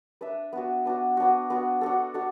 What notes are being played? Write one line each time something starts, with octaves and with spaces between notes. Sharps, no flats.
D4 B4 E5
B3 D4 F#4
B3 D4 F#4
B3 D4 F#4
B3 D4 F#4
D4 F#4 A4
D4 F#4 A4